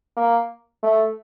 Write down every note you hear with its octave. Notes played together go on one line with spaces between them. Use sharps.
A#3
A3